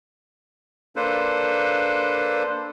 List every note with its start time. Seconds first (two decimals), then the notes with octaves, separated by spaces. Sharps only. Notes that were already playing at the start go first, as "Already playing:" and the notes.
0.96 A#3 D4 A4 B4 C5